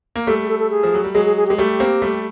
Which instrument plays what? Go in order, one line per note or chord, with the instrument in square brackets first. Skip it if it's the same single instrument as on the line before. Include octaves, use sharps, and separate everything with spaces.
[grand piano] A#3
[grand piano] G3 A3 [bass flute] A4
[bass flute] G#4
A4
A4
G#4
[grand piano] F3
F#3
G3
[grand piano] F#3 G#3 [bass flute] G#4
[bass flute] G#4
G#4
G4
[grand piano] G#3
[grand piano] G3 A3 [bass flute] G4
[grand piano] A#3 C4
G3 A3